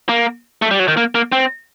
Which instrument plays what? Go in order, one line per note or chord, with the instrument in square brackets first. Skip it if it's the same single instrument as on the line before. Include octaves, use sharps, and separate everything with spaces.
[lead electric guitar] A#3
A3
G3
F#3
D#3
A#3
A#3
C4